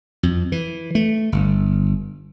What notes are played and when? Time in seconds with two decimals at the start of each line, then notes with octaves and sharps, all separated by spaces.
0.23 F2
0.52 E3
0.95 A3
1.32 G1